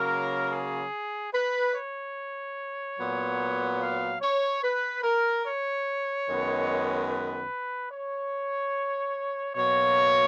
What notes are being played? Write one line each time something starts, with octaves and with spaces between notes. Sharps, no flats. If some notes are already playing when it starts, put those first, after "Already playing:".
Already playing: C#3 F#3 A#3 A#4
G#4
B4
C#5
A#2 F#3 B3
F5
C#5
B4
A#4
C#5
F#2 D#3 G#3 B3
B4
C#5
B2 F#3 A#3 C#5